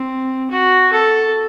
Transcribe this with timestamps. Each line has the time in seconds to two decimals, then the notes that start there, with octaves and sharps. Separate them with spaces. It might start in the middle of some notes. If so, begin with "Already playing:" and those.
Already playing: C4
0.51 F#4
0.92 A4